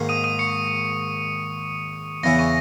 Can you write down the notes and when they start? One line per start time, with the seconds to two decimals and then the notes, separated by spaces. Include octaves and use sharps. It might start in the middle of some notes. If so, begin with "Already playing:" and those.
Already playing: G#2 D#3 A#3
0.09 D#6 D#7
0.24 D#6 D#7
0.39 C#6 C#7
2.23 E2 C#3 E3 A#6
2.39 C#6